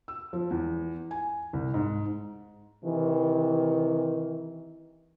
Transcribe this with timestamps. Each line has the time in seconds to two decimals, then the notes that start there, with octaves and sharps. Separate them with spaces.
0.08 E6
0.33 F3
0.51 E2
1.11 G#5
1.53 C2
1.74 G#2
2.84 C3 D#3 E3